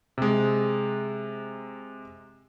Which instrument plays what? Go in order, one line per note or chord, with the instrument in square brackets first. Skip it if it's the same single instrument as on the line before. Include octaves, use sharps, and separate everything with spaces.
[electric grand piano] C3 G#3